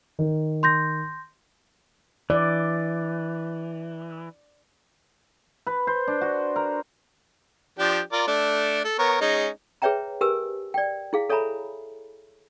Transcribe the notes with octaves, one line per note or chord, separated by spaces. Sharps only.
D#3
C6 G6 A#6
E3 D5
B4
C5
D4
F#4
A#4
F3 D4 G4
F4 A#4 D5
A3 D4
A4
B3 A#4 C#5
G#3 C#4 D#4
G#4 B4 C#5 E5 G5 A#5
G4 A#4 B4 G#5 E6
D5 G5
E4 G#4 F5
A4 C#5 E5 G#5 A#5 B5